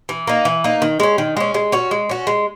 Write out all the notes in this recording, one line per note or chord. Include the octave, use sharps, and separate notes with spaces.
E3
A#3 D#4
E3
A#3 D#4
D#3
G#3 C#4
D#3
G#3 C#4
G#3
C#4 F#4
G#3
C#4 F#4
G#3